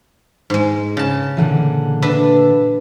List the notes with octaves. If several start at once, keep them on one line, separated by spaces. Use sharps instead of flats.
G#2 G#3
C#3 A5
A#2 D3 E3
D4 B4 E5